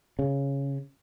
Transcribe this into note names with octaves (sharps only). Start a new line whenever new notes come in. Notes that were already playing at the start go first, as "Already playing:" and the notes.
C#3